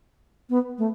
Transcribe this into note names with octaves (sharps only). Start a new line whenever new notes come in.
B3
A3